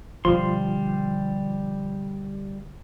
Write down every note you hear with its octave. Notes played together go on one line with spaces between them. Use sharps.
B2 D3 F3 G3 C6